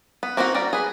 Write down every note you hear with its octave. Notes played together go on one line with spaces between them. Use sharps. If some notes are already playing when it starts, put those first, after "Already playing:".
B3
A#3 C4 D#4 E4 F#4
G3 A#4 D5
G#4 B4